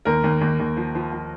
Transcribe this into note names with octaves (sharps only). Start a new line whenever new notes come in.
D#2 A#4
D#2
D#2
D#2
F3
F3
F3